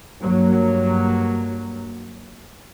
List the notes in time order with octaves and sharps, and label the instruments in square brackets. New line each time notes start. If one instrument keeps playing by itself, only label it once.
[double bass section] G2 F#3 A#3